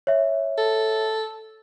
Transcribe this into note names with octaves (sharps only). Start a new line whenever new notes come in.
C#5 E5
A4